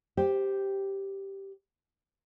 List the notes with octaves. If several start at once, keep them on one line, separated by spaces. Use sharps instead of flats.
G4 C5